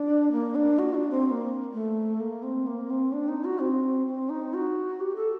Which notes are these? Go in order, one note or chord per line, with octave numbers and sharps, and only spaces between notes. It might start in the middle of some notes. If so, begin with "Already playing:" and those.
Already playing: D4
A#3
D4
F#4
D4
C4
C4
A#3
A3
A#3
C4
A#3
C4
D4
D#4
F#4
C4
C4
D#4
F#4
G4
A4